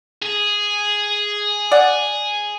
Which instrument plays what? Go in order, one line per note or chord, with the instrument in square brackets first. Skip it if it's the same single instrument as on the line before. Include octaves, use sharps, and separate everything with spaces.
[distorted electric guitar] G#4
[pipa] D5 F#5